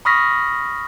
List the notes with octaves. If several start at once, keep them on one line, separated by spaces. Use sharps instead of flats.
B5 C#6 D#6 F6 A#6 B6